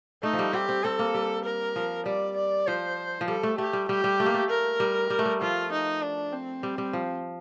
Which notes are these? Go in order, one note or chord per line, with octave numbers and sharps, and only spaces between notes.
A3 D#4
F3
G3
C4 G4
C4
C4 A4
A#3
G3
A#4
F3
G3 D5
D5
F3 C5
F3
G3 A4
A3
A3 G4
G3
G3 G4
G3
A3
A#3
A3
A#4
G3
G3
A3
G3
F3 F4
D#4
D4
C4
G3
G3
F3